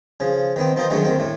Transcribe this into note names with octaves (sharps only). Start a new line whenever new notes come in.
C#3 F3
D#3 B3 C4
F3 D#4 F4 A#4 C5
D3 D#3 F#3 G#3 A3 C#4
D2 D#3 C4
A2 A3